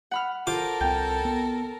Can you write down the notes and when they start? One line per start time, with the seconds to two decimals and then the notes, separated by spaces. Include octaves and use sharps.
0.11 F#5 B5 F6
0.47 F4 A4 A#4 C5 D6
0.81 C2 C4 G5
1.25 B3